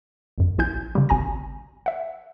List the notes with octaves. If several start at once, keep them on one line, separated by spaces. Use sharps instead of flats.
G#1 F#2
A#1 E4 G#5 G6
C#3 G3
G#1 G#5 A#5 A#6
E5 F#5